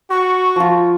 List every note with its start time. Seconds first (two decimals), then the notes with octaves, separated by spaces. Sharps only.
0.11 F#4 C#6
0.56 F3 F4